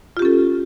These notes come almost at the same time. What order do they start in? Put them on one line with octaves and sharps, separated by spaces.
F4 G4 C#4 A4